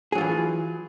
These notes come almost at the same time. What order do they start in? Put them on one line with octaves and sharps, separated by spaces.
G#4 F#3 F4 E3